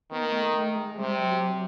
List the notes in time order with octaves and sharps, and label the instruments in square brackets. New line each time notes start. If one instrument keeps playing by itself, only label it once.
[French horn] D#3 [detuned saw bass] B3
[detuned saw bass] A#3
A3
A3
G#3
[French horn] C3 [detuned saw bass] G3
[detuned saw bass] F#3